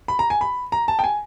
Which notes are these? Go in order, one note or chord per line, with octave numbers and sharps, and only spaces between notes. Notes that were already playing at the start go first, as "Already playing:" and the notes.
B5
A#5
G#5
B5
A#5
A5
G5
G#5